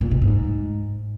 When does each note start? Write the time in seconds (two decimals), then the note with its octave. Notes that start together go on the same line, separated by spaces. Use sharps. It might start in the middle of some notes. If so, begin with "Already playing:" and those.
0.01 A#2
0.11 B2
0.22 G#2